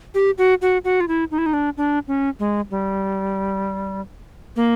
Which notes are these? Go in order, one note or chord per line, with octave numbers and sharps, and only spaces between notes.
G4
F#4
F#4
F#4
F4
E4
D#4
E4
D#4
D4
D4
C#4
G#3
G3
A#3